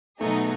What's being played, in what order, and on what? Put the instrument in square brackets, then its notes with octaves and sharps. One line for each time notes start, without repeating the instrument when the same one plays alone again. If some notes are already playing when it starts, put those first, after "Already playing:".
[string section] B2 F#3 B3 D#4 G#4 [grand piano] A3